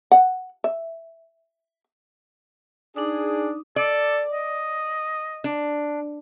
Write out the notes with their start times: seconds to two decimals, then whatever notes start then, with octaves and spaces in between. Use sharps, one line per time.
0.12 F#5
0.64 E5
2.96 D4 D#4 G#4 D6 D#6
3.76 A4 D5
4.32 D#5
5.44 D4